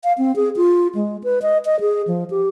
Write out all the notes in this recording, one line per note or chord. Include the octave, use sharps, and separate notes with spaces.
F5
C4
G#4
F4
G#3
B4
D#5
D#5
G#4
F3
G4